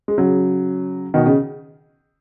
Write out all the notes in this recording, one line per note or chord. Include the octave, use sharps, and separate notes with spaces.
G#3
C#3 F#3
B2 D#3
C#3